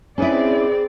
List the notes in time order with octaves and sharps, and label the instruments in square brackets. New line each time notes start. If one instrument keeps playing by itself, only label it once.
[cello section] C4 D5 [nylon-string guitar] C#4 E4 [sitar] D#4 G#4 B4